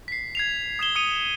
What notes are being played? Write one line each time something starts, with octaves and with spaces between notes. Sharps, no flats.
B6 C7
G#6 C7 F7
D#6 G#6 E7 G7
D#6 C#7 D#7 F7